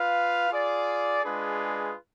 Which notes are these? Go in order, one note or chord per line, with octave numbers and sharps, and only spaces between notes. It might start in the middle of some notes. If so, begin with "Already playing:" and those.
Already playing: F4 B4 F5
F4 G#4 D5
G#3 D4 F4 G#4 B4